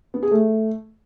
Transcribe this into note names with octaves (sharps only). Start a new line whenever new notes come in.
B3
G#4
A3